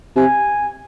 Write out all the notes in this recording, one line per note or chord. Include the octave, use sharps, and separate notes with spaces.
C3 G#5